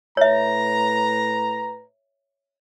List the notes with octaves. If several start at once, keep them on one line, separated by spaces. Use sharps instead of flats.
A2 B4 C#5 E5 A#5